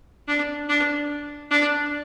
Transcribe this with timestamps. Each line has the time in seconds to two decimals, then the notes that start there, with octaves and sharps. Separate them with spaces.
0.28 D4
0.69 D4
1.51 D4